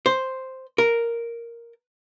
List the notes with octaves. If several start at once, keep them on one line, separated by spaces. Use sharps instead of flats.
C5
A#4